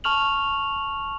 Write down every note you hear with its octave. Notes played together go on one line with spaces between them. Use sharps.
A5 C#6 F6 F7 F#7